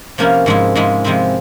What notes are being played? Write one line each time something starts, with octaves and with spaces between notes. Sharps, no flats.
C3 F3 A#3 C#4 E4
G#2 F3 G#3 E4
G#2 F3 G#3 E4
C3 F3 G#3 C4 E4